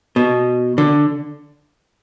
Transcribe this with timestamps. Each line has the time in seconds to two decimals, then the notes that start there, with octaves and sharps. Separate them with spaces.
0.16 B2
0.78 D3